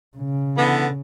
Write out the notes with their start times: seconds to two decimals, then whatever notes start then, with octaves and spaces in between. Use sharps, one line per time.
0.17 C#3
0.58 D3 E3 B3